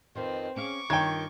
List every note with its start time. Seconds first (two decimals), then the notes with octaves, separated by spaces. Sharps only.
0.16 F2 D#3 F3 C4 B4
0.56 C#4 G#4 F5 C#6 D6
0.90 G2 D#3 F4 C#5 G5 G#6